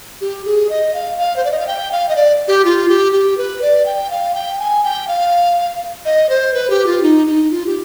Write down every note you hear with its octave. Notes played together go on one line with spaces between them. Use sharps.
G4
G#4
D#5
F5
F5
C5
D5
D#5
F5
G5
F5
D#5
D5
G4
F4
G4
G4
B4
D5
G5
F5
G5
G#5
G5
F5
D#5
C5
B4
G4
F4
D#4
D#4
F4
G4